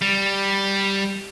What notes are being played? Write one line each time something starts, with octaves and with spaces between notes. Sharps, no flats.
G3